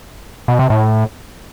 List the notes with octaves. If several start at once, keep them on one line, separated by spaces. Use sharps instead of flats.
B2
C3
A2